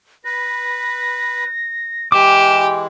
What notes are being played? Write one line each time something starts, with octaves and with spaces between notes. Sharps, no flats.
B4 A#6
E3 G#3 G4 D6 E7